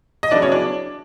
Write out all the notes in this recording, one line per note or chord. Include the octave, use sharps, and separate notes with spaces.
D#5
C#3 F#3 B3 D4 E4 D5
C#4 C#5
D4 D5